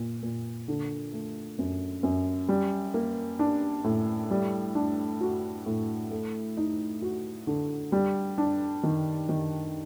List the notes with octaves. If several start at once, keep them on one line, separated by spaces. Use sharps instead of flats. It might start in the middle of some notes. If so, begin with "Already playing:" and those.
Already playing: A#2
A#2
D3
A3
F#2
F#2
G3
A#3
D4
A2
G3
D4
F#4
A2
A3
D#4
F#4
D3
G3
D4
D#3
D#3